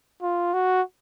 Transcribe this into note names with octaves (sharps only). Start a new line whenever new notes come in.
F4
F#4